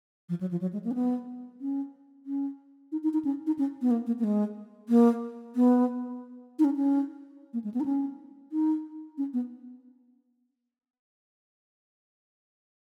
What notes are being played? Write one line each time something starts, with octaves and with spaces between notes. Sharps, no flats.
F3
F#3
F3
F#3
G#3
A#3
C#4
B3
C#4
C#4
D#4
D#4
D#4
C#4
D#4
C#4
B3
A#3
A#3
A#3
G#3
A#3
B3
D#4
C#4
C#4
A#3
G#3
B3
D#4
C#4
D#4
C#4
B3